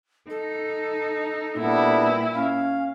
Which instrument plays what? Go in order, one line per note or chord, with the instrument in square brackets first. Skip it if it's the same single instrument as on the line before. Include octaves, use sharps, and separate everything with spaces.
[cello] D#4 [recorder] A4
[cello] A#2 [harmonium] G3 B3 D4 [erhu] E4
[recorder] C#4 [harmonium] F5